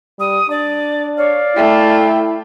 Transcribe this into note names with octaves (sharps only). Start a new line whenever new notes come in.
G3 D#6
D4 D5
C#5 D5 F5
A3 E4 G5